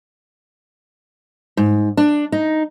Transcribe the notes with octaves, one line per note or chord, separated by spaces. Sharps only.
G#2
D4
D#4